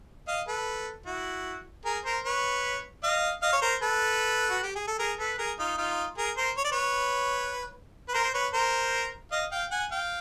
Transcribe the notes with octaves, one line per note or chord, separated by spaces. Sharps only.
D#5 F5
A4 B4
E4 F#4
G#4 A#4
A#4 C5
B4 C#5
D#5 F5
D#5 F5
C#5
A#4 C5
A4 B4
F#4
G4
G#4
A4
G#4 A#4
A4 B4
G#4 A#4
D#4 F4
D#4 F4
G#4 A#4
A#4 C5
C#5
D5
B4 C#5
B4
A#4 C5
C5
B4 C#5
A#4 C5
D#5 F5
F5 G5
F#5 G#5
F5 G5